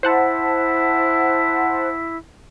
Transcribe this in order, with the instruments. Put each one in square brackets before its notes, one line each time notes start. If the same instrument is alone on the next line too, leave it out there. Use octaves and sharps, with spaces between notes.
[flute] E4 [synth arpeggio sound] C5 F#5 A5